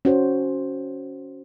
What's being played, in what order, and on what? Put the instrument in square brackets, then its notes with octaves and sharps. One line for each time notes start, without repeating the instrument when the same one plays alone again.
[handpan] C#4 F#4 C5